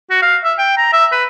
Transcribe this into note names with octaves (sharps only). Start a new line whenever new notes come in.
F#4
F5
E5
G5
A#5
E5
B4